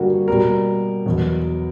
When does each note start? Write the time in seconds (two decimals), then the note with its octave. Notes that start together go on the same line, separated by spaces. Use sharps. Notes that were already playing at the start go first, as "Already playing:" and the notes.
Already playing: G2 D3 G3 A#3 F#4
0.28 B2 G3 A#3 A#4
1.05 E2 B2 F#3